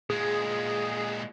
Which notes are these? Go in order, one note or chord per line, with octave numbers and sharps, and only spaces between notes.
A#2 G#3 G#4